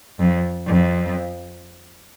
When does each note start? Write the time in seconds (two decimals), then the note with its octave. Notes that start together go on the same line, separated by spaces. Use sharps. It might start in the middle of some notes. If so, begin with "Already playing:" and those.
0.20 F2
0.67 F2